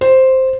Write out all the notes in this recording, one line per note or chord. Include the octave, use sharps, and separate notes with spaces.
C5